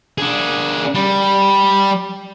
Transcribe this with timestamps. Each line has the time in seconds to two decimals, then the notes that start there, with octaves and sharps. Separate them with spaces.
0.18 D4 G#4
0.95 G3